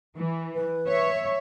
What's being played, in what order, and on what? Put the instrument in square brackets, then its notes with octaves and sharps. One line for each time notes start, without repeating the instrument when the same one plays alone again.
[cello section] E3
[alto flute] B4
[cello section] C#5 E5